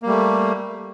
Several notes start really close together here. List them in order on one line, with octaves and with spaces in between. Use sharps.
A#3 G3 A3